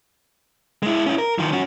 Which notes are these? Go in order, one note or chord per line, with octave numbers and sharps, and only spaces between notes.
G#3 E4
C#4 E4
A#4
D#3 F3
C#4 F#4